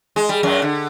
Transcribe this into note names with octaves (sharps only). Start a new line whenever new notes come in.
G#3
G3
F#2 F#3
D3